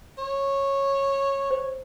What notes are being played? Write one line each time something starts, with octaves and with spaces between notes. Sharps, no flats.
C#5
C5